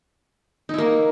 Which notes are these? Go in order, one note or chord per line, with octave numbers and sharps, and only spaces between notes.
A#3 D#4 E4